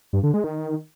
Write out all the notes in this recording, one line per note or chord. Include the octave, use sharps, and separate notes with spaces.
G2
D3
G#3
D#3